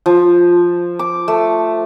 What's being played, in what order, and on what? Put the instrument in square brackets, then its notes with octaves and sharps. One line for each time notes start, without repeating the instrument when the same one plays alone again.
[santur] F3
D6
A3